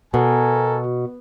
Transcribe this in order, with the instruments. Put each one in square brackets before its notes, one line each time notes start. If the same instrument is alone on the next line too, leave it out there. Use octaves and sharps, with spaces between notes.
[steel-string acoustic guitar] B2 [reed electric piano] F#4 [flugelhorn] A4 [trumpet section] A#4 G#5